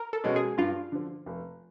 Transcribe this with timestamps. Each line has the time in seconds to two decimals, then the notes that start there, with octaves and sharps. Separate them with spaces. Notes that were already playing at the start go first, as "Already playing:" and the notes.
Already playing: A#4
0.13 A4
0.24 B2 G#3 C#4 F#4
0.36 G#4
0.58 G2 F4
0.92 D3 F3
1.26 F1